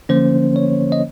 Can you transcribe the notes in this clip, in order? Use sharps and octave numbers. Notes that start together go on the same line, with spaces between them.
D3 F3 A#3 C#4 C5
C#5
D#5